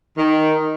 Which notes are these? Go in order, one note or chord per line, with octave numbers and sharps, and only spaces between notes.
D#3